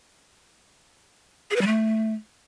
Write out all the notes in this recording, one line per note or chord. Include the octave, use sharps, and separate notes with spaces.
G#4
B4
G3
A3